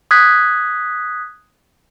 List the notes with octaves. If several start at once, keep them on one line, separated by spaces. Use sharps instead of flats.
D#6 F#6 G#6 B6